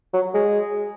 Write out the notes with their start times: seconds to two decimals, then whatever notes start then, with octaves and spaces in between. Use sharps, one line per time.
0.14 F#3
0.35 G#3